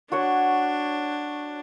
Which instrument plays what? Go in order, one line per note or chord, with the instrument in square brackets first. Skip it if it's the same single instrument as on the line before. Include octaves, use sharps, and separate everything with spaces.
[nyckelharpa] D4 [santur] F#4 C#5 F#5